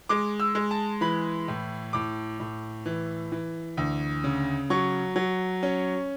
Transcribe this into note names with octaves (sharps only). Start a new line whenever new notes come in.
G#3 D6
E6
G#3
A5
E3 B5
A2
A2 D6
A2
E3
E3
D2
C#3
F#3 C#6
F#3
C#4